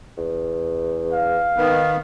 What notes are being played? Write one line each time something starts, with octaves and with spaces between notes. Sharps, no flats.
E2
F5
D#3 B3